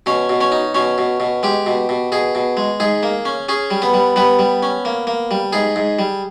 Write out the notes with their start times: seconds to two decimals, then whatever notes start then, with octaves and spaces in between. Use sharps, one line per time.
0.06 B2 C#4 C#5
0.29 B2
0.41 C#4 C#5
0.52 D#4
0.74 B2 C#4 C#5
0.98 B2
1.20 B2
1.43 G#3 G4
1.66 B2
1.89 B2
2.12 B2 G#4
2.35 B2
2.57 G#3
2.80 G#2 G#4
3.03 A#3
3.25 C#4
3.49 C#4 G#4
3.71 G3
3.82 B3 B4
3.94 G3
4.16 G3 B3 B4
4.39 G3
4.63 C#4
4.85 A#3
5.07 A#3
5.31 G3
5.53 G#2 G#4
5.76 G#2
5.99 G3